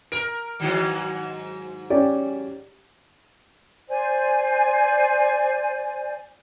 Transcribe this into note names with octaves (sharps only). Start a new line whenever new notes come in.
A#4 D7
G#2 D#3 F#3
C#4 G4 D5
C5 D5 G#5